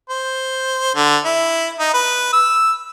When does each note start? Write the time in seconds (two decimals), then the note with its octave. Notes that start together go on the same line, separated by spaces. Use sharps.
0.10 C5
0.95 D3
1.25 E4
1.79 D#4
1.94 B4
2.33 E6